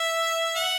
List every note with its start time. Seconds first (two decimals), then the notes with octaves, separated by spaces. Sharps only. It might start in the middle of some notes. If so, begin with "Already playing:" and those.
Already playing: E5
0.56 F#5